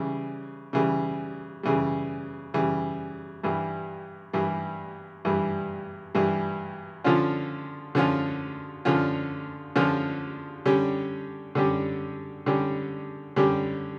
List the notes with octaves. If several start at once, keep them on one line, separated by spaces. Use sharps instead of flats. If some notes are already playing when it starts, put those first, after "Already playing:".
Already playing: C#3 E3 G3
C#3 E3 G3
C#3 E3 G3
C#3 E3 G3
G2 E3 G3
G2 E3 G3
G2 E3 G3
G2 E3 G3
D3 F3 C#4 F4
D3 F3 C#4 F4
D3 F3 C#4 F4
D3 F3 C#4 F4
D3 G3 C#4 G4
D3 G3 C#4 G4
D3 G3 C#4 G4
D3 G3 C#4 G4